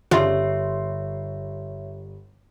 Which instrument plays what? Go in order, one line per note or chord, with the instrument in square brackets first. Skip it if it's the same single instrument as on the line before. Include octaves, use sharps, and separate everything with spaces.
[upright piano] G1 G3 C6 [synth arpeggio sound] C#3 D4 F4 [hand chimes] C#5 E5